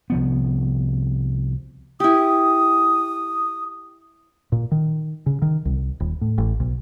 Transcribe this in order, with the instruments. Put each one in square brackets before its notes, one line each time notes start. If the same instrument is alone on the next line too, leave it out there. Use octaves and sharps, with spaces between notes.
[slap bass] C2 F3 B3
[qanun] E4 G4 [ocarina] D#6
[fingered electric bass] A#2
D#3
C#3
D#3
C2
D#1
A2
A1
B1